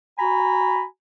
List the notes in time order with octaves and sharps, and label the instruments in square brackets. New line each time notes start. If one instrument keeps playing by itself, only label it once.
[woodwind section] F#4 G#5 A#5 B5